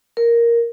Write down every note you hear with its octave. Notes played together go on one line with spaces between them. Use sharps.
A#4